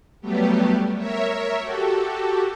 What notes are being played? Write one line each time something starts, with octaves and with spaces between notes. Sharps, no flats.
F#3 G3 A3 B3 G4
A#4 C#5 E5
F#4 G4 A4